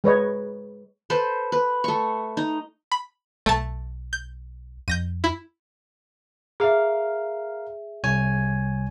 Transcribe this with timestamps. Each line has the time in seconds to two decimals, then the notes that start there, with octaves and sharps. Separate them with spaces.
0.04 G#3 B4 C#5 D#5
1.10 A4 B4 C5
1.52 B4
1.84 A3 C#6
2.37 D#4
2.92 B5
3.46 B1 A3 A5
4.13 G6
4.88 F2 G6 A#6 D#7
5.24 E4
6.60 G#4 A#4 E5 F5
8.04 C2 C#5 G#5